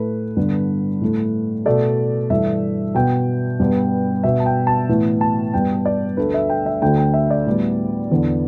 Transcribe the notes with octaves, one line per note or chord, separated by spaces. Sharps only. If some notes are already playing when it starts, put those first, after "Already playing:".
Already playing: A2 A3 B4
G2 D3 B3
A2 A3
B2 A3 D5
G2 E3 A3 E5
B2 B3 G5
G2 G3 B3
B2 B3 E5
A5
G5
A5
A2 E3 B3
A5
G2 G3 B3 G5
D5
D2 D3 A3 B4
E5
G5
E5
D2 D3 A3 G5
G5
E5
D5
A2 G3 B3
E2 D3 B3